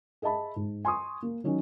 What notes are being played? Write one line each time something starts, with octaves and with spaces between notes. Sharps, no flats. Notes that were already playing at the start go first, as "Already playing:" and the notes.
G#4 D#5 E5 A5 B5
G#2
G#5 C6 C#6 D#6
A#3
D#3 F#3 C#4 D#4